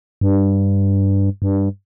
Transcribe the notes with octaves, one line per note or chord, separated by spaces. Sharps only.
G2
G2